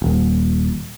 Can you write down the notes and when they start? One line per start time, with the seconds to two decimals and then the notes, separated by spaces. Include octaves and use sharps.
0.02 D#1